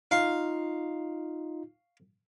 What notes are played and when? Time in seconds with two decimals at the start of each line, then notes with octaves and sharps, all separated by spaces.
0.11 D#4 F4 F5 C#6